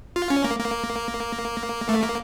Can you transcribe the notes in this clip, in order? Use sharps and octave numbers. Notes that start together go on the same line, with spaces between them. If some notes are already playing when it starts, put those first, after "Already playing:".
F4
C#4
A#3
A#3
A3
A#3